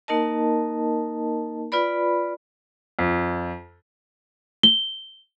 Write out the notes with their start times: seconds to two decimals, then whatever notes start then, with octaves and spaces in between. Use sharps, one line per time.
0.08 A#3 D#4 A#4 D#5 A5
1.72 F4 B4 D5 B5
2.99 F2
4.63 G7